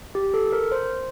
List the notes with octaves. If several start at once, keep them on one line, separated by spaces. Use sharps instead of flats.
G4
A4
A#4
C5